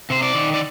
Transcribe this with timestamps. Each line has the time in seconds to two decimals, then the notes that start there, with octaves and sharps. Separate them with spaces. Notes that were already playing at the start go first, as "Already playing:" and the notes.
0.10 C3 C5
0.23 D5
0.35 D#3
0.54 D5